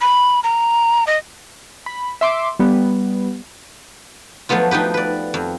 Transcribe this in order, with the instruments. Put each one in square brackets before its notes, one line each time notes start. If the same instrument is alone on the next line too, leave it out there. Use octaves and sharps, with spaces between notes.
[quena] B5
A#5
D#5
[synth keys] B5
E5 C6 D6
G3 B3
[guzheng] F3 F#3 A3 B3 F4
F3 D#4 G4 B4
B4 D5
F2